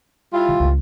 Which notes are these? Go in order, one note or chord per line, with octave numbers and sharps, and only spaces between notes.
G3 E4 F4
D#3
C#2 D#3